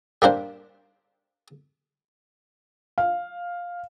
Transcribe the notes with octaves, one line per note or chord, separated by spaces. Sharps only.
G3 A#3 D4 C5
F5